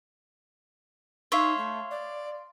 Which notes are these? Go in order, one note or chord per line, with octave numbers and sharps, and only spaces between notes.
D#4 C#5 E5 F5 C6
A3
D5